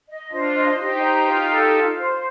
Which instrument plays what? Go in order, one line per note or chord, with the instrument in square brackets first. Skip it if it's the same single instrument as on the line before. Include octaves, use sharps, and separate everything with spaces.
[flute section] D#5
[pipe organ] D4 F4 [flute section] C5
[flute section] D#5
[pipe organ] D#4 G4 [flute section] C5
[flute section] A#5
F4
A4
F4
C5